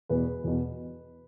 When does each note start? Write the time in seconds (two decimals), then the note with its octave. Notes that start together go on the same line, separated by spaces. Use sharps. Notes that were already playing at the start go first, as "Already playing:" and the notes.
0.09 E2 B2 B4
0.44 E2 B2